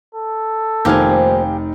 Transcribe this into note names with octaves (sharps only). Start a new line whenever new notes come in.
A4
F1 D#3 F3 A#3 G4 F5 G#5